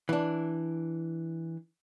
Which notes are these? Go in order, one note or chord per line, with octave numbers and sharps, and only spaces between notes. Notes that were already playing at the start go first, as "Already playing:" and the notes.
E3 D4